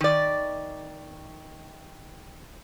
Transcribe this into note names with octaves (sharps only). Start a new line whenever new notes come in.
D#3 D5